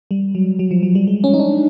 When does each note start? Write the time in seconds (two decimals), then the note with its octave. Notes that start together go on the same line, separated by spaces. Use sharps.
0.11 G3
0.35 F#3
0.59 F#3
0.71 F3
0.83 F#3
0.95 G3
1.07 G#3
1.24 C#4
1.34 D#4
1.40 D4